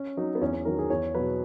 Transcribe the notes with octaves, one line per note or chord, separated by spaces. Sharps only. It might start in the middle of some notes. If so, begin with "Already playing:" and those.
Already playing: C#4
F#3 D#4
B3
E2 C#4
C#4
D#3 F#3 A#4
G#4
E2 C#5
B2 F#3 B4